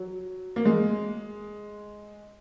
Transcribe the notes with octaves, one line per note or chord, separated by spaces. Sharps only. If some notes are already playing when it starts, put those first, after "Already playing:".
Already playing: F#3
A#3
G#3